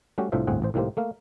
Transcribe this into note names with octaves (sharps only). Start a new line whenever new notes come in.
G3 A3 C#4 F#4 G4
C2 A2 D4 F4 C5 E5
G1 D2 A2 C4 G#4 F#5
A1 C5
C2 A2 D#3 A#3 G4 C5
A3 A#3 F5